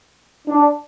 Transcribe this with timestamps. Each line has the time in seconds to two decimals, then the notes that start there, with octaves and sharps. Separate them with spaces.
0.48 D4